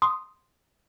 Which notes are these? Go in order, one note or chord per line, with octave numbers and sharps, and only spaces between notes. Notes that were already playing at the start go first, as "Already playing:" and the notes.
C6 D#6